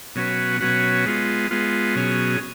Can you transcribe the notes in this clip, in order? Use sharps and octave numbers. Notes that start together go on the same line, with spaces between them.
B2 F#3 C#4 F#4 B4
B2 F#3 C#4 F#4 B4
G#3 B3 F4
G#3 B3 F4
B2 F#3 C#4 G#4